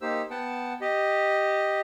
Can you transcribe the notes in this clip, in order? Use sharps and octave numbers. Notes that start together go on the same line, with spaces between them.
A#3 D#4 G4 C5 E6
B3 F#5 G5 A5
G4 D#5